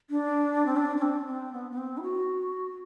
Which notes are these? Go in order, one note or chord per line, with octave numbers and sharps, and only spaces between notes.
D4
C4
D4
D4
C4
C4
B3
B3
C4
E4
F#4